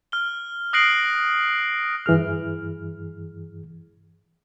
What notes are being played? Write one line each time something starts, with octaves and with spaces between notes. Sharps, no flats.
F6 G7
D#6 F#6 A#6 C7 D7 F#7
G2 E3 G#4 F6